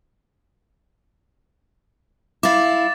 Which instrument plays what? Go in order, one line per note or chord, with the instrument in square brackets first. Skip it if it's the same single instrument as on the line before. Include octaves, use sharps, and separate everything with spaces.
[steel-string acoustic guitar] E4 F5 [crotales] D6 A6